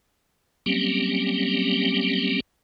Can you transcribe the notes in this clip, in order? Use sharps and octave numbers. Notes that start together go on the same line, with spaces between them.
F#3 G3 A#3 C4 C#4 G4